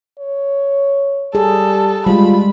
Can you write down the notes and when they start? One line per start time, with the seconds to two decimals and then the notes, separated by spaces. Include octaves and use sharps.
0.19 C#5
1.35 G3 G#4 A4
2.07 G3 G#3 F4 B5